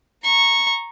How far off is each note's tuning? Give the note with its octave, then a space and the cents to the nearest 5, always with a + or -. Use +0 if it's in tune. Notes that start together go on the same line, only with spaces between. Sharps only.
A#5 +0 C#6 -10